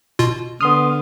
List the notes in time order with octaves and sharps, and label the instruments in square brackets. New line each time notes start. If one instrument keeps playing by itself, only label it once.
[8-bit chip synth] B2 F4
[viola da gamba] D3 [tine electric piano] B3 C6 F6 [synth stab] D#6